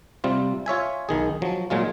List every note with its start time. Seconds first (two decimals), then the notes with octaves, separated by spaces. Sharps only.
0.24 C3 G3 C4 F4
0.66 F4 C#5 E5 G#5
1.09 B1 D#3 G#4
1.42 F3 F#3
1.70 A#2 F#3 G#3 F4